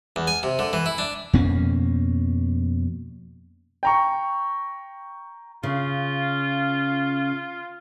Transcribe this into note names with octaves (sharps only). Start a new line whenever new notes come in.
E2
G#5
C3
D3
E3
E4
D4
F2 B2 A#3 C#4
G5 A#5 C#6
C#3 F4